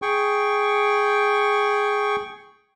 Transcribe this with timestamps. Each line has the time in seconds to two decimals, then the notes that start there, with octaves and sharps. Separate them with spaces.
0.02 G#4 G5 C#6